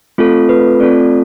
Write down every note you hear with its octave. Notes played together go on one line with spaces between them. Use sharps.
A3 C4 F4 A4
B4
A3 C4 F4 A4 D5